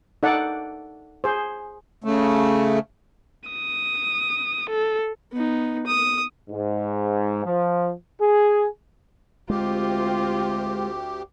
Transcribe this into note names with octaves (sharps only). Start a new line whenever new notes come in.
D#4 A4 D5 F#5
G#4 C5
C#3 A3
D#6
A4
B3 D#4
D#6
G#2
F3
G#4
D2 G#3 C4 F4 G4